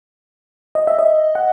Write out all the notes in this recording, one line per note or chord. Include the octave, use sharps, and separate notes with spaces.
D#5
E5
D#5
F#5